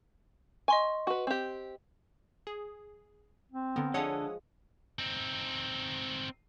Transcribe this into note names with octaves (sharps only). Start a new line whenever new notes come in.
D#5 G#5 C6 C#6
F#4 B4
C4 G4
G#4
C4
D3 B3 A#4
D3 F3 G#3 A4 C#5 F#5 D#6
C4 D#4